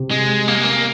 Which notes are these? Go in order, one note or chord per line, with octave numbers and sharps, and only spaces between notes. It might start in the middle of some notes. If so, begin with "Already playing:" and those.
Already playing: C3
G#3
A#3
G#3
A#3